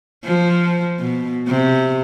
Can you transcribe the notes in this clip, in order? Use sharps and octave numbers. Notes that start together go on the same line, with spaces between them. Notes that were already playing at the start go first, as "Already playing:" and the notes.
F3
B2
C3